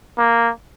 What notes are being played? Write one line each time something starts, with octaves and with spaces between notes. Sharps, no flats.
A#3